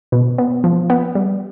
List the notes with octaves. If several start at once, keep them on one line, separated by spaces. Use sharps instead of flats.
B2
B3
F3
B3
G3